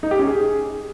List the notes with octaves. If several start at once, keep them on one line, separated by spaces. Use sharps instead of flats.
D#4
G4
C#4
G#4